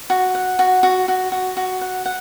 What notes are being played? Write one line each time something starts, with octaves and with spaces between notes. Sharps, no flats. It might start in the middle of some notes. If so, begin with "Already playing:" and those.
F#4
F#5
F#4
F#4
F#4
F#4
F#4
F#5
F#5